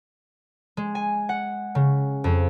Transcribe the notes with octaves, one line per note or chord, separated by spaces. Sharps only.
G#3
G#5
F#5
C#3
F2